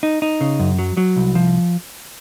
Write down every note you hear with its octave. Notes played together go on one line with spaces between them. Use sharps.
D#4
D#4
C#3
F#2
F#3
F#3
C2
F3